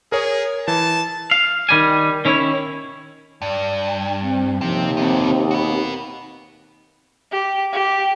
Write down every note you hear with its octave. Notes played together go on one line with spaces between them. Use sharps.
G#4 A#4 C#5
E3 A5
F5
D#3 G3 G#5
D#3 C#4 E4 C#5
G2 D5
C4
D#2 C3 F3
F2 C3 C4
F#4 B4
G4
G4